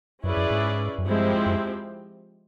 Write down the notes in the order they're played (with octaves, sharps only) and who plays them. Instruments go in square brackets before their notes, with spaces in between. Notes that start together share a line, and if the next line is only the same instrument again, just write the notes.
[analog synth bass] F#2 [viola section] C#4 E4 G#4 B4 D5
[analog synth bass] F#2
G#2
F#2
[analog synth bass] G2 [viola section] F3 G#3 C4 E4 G4
[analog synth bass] F#2